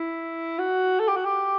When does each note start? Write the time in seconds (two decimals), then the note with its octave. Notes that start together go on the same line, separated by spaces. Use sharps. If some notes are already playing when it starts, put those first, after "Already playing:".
Already playing: E4
0.59 F#4
1.00 A4
1.08 G4
1.16 F#4
1.25 G4